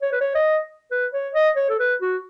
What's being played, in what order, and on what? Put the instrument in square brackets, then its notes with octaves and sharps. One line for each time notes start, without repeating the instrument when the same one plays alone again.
[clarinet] C#5
B4
C#5
D#5
B4
C#5
D#5
C#5
A4
B4
F#4